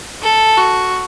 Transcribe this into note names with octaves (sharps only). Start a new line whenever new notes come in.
A4
F#4